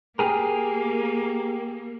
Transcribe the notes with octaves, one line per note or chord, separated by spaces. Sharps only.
A#3 G4 G#4 A#4